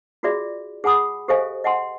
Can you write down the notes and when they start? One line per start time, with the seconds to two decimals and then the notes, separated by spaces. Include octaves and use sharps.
0.23 F4 F#4 G#4 D5 E5
0.84 G#4 F#5 G#5 B5 D#6
1.28 G4 A4 C5 D#5 F5 G#5
1.64 D#5 F#5 G#5 C6